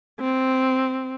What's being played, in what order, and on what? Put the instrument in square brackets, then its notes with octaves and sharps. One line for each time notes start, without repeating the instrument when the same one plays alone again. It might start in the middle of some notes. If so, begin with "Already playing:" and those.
[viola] C4